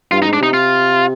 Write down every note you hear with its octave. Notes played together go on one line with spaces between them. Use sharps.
G2 F4
D#4
G#2
D4
C3 D#4
F4